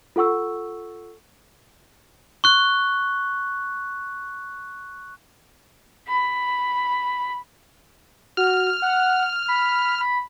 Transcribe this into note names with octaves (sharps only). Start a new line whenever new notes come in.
F4 A4 F#5 C#6 E6
C#6 F#6
B5
F#4 F6
F#5
B5
B5